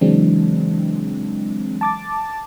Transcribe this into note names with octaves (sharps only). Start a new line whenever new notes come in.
C#3 E3 F#3 G#3 C4 D4
A5 D6 A6